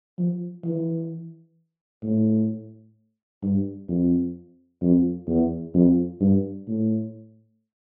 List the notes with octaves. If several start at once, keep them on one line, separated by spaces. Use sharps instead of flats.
F3
E3
A2
G2
F2
F2
E2
F2
G2
A2